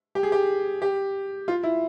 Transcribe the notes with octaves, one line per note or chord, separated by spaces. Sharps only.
G4
G#4
G4
G4
F4
E4